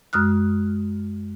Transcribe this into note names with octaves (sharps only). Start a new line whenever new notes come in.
F#2 G#3 D#6 F6 F#6